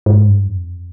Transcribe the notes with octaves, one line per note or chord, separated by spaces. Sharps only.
G#2
G2
F2